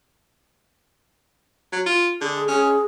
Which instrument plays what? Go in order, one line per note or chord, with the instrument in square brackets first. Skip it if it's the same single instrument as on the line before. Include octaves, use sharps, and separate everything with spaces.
[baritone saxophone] F#3
F4
[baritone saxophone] D3 [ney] G#4
[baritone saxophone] C#4 [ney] G#4